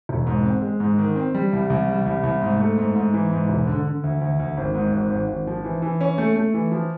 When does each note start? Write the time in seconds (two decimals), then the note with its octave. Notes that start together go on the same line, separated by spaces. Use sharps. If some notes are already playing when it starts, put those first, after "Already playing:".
0.09 E1
0.27 G#2
0.45 C4
0.62 G#3
0.80 G#2
0.98 D#3
1.16 C4
1.34 G3
1.53 C2
1.70 C2
1.88 G3
2.06 C2
2.23 C2
2.41 G#2
2.59 A3
2.78 G#2
2.96 G#2
3.14 E3
3.31 G#2
3.49 E1
3.67 D3
3.85 D3
4.03 D2
4.21 D2
4.39 D2
4.57 G#1
4.74 G#2
4.93 G#1
5.10 G#1
5.28 G#1
5.47 F3
5.64 E3
5.82 E3
6.01 C#4
6.18 A3
6.36 A3
6.54 E3
6.72 F3